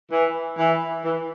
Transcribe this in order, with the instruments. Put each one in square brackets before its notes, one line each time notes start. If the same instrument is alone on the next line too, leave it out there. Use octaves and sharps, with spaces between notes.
[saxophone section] E3
E3
E3